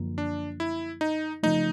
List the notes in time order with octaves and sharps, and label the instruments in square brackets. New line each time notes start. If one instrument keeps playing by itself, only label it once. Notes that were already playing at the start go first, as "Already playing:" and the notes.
Already playing: [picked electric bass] F#2 D3 F3 A#3
[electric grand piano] D4
E4
D#4
[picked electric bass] C#3 F3 A3 [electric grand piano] D#4